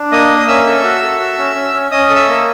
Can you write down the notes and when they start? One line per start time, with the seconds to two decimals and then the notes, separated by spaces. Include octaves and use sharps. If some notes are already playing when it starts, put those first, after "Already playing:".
Already playing: D4
0.11 A#3 D#5 D#6
0.31 A#3
0.48 C#4 E5 E6
0.66 A4
0.84 F#4
1.02 A4
1.20 F#4
1.38 C#4
1.56 C#4
1.74 C#4
1.91 C#4 D#5 D#6
2.10 A4
2.16 E5 E6
2.28 A#3